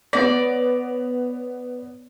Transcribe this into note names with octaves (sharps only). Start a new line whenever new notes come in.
B3 C#5 D5 A#6